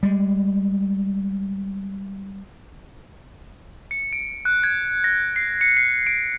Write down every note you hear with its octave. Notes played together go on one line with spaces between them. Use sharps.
G3 G#3
C#7
D7
F#6
G#6
A#6
C7
C#7
C7
D7